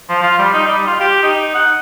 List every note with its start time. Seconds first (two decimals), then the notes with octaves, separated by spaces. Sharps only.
0.09 F3
0.23 F4
0.39 G3
0.54 D#4
0.68 G3
0.87 F4
1.00 G4
1.23 D#4
1.55 F#5